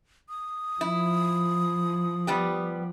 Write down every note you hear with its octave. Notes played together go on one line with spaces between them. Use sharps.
D#6
F3 E4
G3 B3 G4